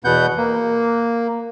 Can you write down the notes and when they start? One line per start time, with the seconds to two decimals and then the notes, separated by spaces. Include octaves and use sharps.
0.05 E2 B2 B3 F#5 G6
0.37 A#3